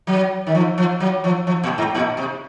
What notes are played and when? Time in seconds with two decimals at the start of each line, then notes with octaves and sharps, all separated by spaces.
0.07 F#3
0.47 D#3
0.55 F3
0.78 F3
1.00 F#3
1.24 F3
1.47 F3
1.64 A#2
1.78 G#2
1.95 A#2
2.17 C3